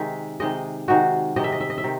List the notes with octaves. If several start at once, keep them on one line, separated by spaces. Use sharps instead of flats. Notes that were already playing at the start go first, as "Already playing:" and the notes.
Already playing: C3 D#3 G#3 E5
C3 D#3 G#3 D#5
C3 D#3 G#3 F#4
C3 D#3 G#3 D#5
E5
D#5
E5
D#5
E5
C3 D#3